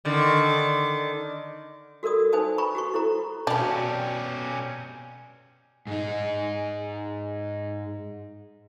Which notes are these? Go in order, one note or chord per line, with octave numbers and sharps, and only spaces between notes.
D3 D#3
F#4 A4 A#4 D5 D#6
D#4 B4 C5 G#5 A5 D#6
G#5 A#5 B5 C#6
F#4 G4 C#6
E4 A4 C5 A#5
B2 C#4 D4 G4 D5 F5
G#2 D#4